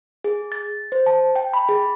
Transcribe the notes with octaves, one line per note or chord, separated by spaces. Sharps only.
G#4
A6
C5
A5
G5
B5
G#4